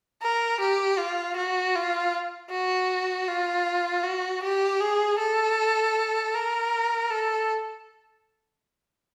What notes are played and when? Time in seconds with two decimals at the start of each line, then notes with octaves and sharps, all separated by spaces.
0.22 A#4
0.60 G4
0.98 F4
1.36 F#4
1.75 F4
2.51 F#4
3.28 F4
4.04 F#4
4.43 G4
4.80 G#4
5.18 A4
6.34 A#4
7.11 A4